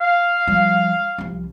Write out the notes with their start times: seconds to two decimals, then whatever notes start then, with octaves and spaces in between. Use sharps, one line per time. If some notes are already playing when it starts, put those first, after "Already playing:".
0.01 F5
0.47 F3 G3
1.18 C2 F3